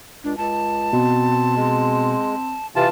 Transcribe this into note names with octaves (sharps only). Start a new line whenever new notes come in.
C#2 D4
C#2 A5
B2 C4
G#3 C4
C3 E3 F4 A5